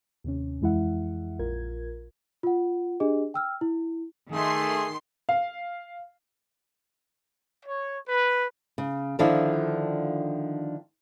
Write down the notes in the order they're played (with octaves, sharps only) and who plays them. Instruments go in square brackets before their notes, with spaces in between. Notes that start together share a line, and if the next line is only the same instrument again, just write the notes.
[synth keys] D#2 C3 C#4
F2 E3 G#3 E4 E5 F#5
A#1 F4 A#4 G#6
[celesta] F4 F#5
D4 G4 G#4 D#5
G5 E6 F6
E4
[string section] D#3 C6 [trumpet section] A3 G#4
[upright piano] F5
[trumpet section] C#5
B4
[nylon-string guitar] C#3
D3 D#3 F3 D4 E4 F4